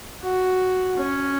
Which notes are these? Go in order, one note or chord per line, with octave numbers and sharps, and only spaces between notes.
F#4
C#4